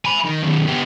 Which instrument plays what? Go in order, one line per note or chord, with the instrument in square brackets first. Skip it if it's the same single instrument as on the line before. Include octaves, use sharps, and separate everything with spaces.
[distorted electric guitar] G#5 B5
D#3
F#2 D#3
B3 G4